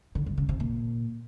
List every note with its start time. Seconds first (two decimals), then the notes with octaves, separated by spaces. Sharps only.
0.15 D3
0.26 G2
0.38 C#3
0.49 C3
0.60 A#2